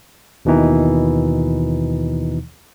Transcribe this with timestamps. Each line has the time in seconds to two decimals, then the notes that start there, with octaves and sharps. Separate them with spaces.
0.45 D#2 B2 D#3 E3 D#4